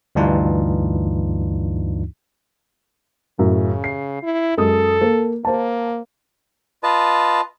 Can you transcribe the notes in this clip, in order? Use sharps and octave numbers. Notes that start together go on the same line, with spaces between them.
D2 G2 E3 D4 D#4 F4
F#2 A2 C#3
C7
E4
F#2 G#3 A4 D#6
A#3
A#3 C5 A5
F4 B4 D#5 A5